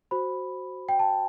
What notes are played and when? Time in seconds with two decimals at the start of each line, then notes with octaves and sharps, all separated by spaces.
0.11 F#4 C5 B5
0.89 G5
0.99 A5